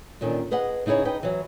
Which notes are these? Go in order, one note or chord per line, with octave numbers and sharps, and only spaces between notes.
A#2 D3 D#3 C#4
G#4 B4 D#5 F#5
C#3 D#4 E4 G#4 C#5
D#4 B4 G5
E3 F#3